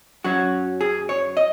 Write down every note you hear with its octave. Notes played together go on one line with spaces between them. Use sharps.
F#2 F#3 C#4 F#4
G#4
C#5
D#5